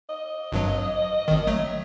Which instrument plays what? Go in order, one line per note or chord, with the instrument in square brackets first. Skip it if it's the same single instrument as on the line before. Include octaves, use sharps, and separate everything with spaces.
[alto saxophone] D#5
[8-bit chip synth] G#1 G2 F#3
G#1 D#3
F#3 A3